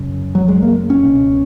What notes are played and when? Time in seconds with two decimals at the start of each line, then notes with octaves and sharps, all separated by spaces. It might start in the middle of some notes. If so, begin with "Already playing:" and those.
Already playing: F#2 C#3
0.35 F#3
0.48 G#3
0.63 A#3
0.90 C#4
1.03 C#2 B2